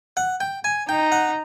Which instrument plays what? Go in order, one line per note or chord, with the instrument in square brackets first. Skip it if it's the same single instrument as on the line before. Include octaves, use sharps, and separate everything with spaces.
[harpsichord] F#5
G5
G#5
[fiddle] D#4 [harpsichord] G5
[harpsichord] F#5